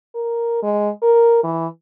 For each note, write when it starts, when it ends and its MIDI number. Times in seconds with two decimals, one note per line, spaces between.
0.15 0.59 70
0.63 0.89 56
1.03 1.43 70
1.43 1.67 52